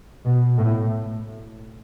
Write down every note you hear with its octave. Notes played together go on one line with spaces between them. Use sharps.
B2
A2